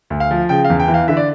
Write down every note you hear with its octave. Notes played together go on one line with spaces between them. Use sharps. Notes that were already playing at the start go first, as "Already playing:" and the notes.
D2
F5
F3
C#3 G5
F5
E2
G5
E3
F5
D3 E5
D5